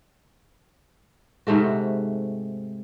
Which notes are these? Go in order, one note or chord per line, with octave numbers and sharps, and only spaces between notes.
G#2 C3 A3 F#4